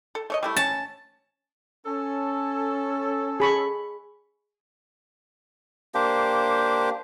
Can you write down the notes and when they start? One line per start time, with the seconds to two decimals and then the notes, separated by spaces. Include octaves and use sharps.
0.15 A4
0.30 A3 C#5 D#5
0.43 G3 A3 E4
0.56 C#4 A5
1.86 C#4 A4
3.40 G#4 B5 C#6
5.95 A#3 D4 G4 C5